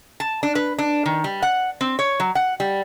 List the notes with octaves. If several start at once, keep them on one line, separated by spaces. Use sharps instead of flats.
A5
D4
B4
D4
D#3
G3
F#5
C4
C#5
F#3
F#5
G3